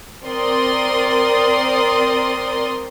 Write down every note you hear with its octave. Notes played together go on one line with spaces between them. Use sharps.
C4 A#4 D5 C6 D#6